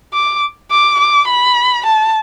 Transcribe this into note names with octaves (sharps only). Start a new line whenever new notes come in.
D6
D6
D6
B5
A5